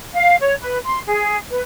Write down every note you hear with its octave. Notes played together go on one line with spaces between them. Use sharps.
F5
C#5
B4
C6
G#4
B4